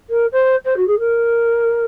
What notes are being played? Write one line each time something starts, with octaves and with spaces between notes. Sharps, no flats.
A#4
C5
C5
F#4
G#4
A#4